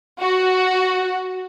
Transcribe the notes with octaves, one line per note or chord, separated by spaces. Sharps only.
F#4